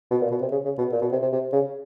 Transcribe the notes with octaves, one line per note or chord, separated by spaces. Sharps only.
B2
A#2
B2
C3
C#3
C#3
B2
A#2
B2
C3
C3
C3
C#3